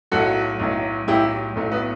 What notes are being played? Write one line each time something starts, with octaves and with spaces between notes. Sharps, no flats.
B1 A2 F#3 F#4 A4
B1 A2 F#3
B1 A2 F#3 E4 G4
B1 A2 F#3 A3
B3